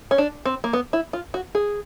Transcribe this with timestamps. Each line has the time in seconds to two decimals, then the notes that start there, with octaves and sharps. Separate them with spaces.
0.11 C#4
0.18 D4
0.45 C4
0.64 A#3
0.73 B3
0.93 E4
1.13 F4
1.34 F#4
1.55 G#4